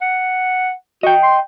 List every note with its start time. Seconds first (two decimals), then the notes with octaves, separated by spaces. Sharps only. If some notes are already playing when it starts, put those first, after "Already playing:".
0.01 F#5
1.03 F#4 D#5 G5
1.23 C6